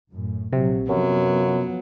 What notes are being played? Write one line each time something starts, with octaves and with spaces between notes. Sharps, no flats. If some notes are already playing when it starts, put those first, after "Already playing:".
F#2 A2
A#1 C3 F#3
F#2 F3 F#3 B3